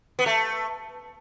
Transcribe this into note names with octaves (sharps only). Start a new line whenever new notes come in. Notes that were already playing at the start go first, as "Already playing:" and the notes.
B3
A3